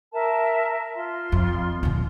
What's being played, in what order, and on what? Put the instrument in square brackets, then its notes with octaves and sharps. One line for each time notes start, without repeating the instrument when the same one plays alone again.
[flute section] A#4 E5 A5
F4 C6
[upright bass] F2
D2 A#2